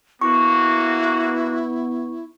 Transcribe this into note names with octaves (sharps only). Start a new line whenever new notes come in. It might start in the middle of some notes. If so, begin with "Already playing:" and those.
A#3 B3 E4 F#4 C#6